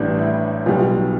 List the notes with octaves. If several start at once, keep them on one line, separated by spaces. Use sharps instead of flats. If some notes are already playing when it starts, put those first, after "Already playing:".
Already playing: A1 A2 E3 G3 D4
E4
B1 B2 G3 F4